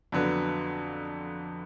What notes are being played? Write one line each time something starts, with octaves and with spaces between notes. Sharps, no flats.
F2 D3 F#3 B3